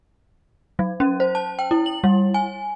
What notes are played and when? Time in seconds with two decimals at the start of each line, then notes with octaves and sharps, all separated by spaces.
0.79 F#3
1.00 C#4
1.20 C5
1.35 A5
1.59 G5
1.71 E4
1.86 F#7
2.04 G3
2.34 G#5